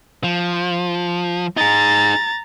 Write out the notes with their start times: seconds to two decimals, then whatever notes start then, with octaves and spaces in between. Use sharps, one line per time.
0.24 F3
1.57 D#4 G#4 A#5 A6